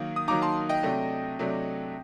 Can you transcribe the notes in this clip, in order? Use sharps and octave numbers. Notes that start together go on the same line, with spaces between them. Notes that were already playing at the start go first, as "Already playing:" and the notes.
Already playing: D#3 F#3 A#3
D#6
D#3 F#3 A#3 D#4 A#5 D6
A5 C6
D#5 G5
C3 F#3 A3 D4
C3 F#3 A3 D4